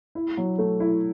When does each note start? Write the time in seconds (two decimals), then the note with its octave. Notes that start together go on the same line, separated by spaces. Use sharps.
0.15 E4
0.37 F#3
0.59 A3
0.80 E4